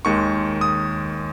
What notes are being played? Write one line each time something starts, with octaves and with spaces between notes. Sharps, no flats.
D#2 D#3 G#3 C#6
D#6